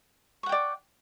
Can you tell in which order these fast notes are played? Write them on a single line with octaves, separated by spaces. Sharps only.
C#6 F#5 G5 D5